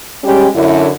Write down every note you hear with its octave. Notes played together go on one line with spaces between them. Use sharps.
G3 G#3 C#4 G4
F#2 D3 E4